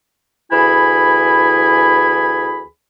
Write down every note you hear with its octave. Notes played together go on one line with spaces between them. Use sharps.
D2 E3 E4 G#4 G#5 B5